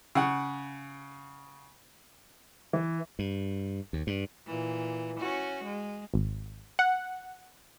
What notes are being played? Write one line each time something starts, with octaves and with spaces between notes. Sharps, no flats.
C#3 F#5
E3
G2
D#2
G2
A#2 E3
C#4 F#4
G#3
G#1
F#5